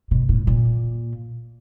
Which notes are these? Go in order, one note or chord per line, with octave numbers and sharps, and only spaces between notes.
B2
A2
A#2